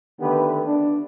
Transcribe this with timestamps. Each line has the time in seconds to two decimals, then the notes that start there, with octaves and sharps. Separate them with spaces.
0.20 D3 D#3 A3 B3 G4 B4
0.65 D4